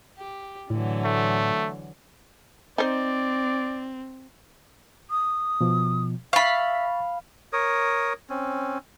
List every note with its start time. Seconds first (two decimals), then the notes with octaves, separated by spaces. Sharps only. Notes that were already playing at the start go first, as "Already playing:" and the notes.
0.18 G4
0.70 A2 D3 E3 F#3
1.04 A3
2.78 C4 D#4 C5 D5
5.10 D#6
5.61 B2 F3
6.33 E5 F5 B5 C#6 A6
7.53 A#4 C#5 D#6
8.30 C4 C#4